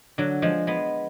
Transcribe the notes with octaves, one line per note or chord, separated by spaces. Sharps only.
D3 F#3
F3 G#3
G#3 B3